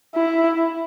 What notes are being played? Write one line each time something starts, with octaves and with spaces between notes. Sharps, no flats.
E4